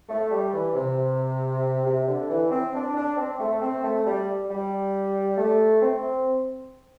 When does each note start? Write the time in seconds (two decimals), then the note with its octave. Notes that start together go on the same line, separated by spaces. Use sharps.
0.09 A3
0.31 G3
0.53 E3
0.74 C3
1.85 C3
2.08 D3
2.29 E3
2.51 C4
2.74 D4
2.95 D4
3.17 C4
3.39 A3
3.61 C4
3.83 A3
4.05 G3
4.49 G3
5.37 A3
5.81 C4